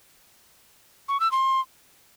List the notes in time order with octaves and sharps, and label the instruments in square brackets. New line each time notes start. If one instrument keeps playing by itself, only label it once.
[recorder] C#6
E6
C6